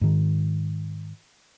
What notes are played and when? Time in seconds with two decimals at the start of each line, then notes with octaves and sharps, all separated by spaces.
0.01 G#2 D#3